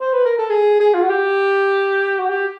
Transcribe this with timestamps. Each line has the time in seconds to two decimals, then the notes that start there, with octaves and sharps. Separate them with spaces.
0.00 C5
0.13 B4
0.25 A#4
0.38 A4
0.50 G#4
0.80 G#4
0.94 F4
1.02 F#4
1.10 G4
2.19 F#4
2.29 G4